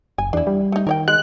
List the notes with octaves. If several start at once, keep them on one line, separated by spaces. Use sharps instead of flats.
F#1 G#5
E2 D4 E4
G3
A3 D#4
D#3 A#4 C#5 G5
G#3 F#6